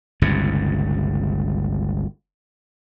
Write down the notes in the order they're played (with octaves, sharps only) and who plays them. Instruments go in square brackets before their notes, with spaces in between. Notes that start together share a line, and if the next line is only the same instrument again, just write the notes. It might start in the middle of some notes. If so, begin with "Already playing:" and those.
[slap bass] G1 C#2 G2 C3